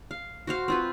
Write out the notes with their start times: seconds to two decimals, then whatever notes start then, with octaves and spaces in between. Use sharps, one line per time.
0.11 F5
0.47 F#4 C5 F5
0.68 C4 F4 B4